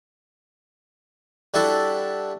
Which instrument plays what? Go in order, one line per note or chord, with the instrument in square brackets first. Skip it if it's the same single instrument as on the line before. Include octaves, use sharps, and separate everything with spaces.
[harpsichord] G3 D4 E4 F#4 A4